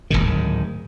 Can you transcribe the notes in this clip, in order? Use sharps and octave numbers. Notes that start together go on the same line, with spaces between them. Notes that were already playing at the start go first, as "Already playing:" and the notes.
D1 G1 G#2 D#3